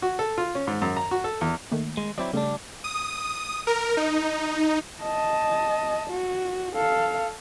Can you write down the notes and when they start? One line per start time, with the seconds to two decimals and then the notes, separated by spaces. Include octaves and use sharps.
0.02 F#4
0.19 A4
0.38 F4
0.55 C#4
0.67 G#2
0.82 F#2
0.97 A#5
1.11 F#4
1.24 A4
1.41 E2
1.71 D#3 A3 A#3
1.97 G#3
2.18 F#3 C4 E4 D5
2.33 C#3 G3 A3 D4
2.84 D#6
3.67 A#4
3.97 D#4
5.02 D#5 A5
6.10 F#4
6.76 A4 F5